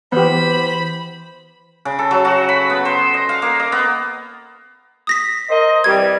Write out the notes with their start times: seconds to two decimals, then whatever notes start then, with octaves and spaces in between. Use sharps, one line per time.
0.12 E3 B3 G4 C5 B5
1.85 C#3
1.99 A4
2.11 F#3
2.25 F#4
2.49 B5
2.70 B3
2.85 C5
3.14 D#5
3.29 F5
3.42 A#3
3.60 D#5
3.72 B3
5.07 D#6 A#6 B6
5.50 A#4 C5 D#5
5.84 C3 E3 G3 G#6